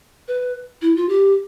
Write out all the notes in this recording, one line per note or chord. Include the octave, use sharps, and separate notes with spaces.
B4
E4
F4
G4